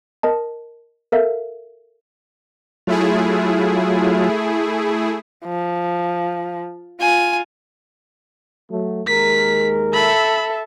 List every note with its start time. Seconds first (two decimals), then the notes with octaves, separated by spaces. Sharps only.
0.23 A#4 D#5 A5
1.12 A4 A#4 E5 F5
2.87 F#3 A3 E4 F4 G#4
5.45 F3
7.01 F4 G#5
8.71 F#3 A3
9.07 D#2 G#3 A#4 B6
9.93 A4 E5 B5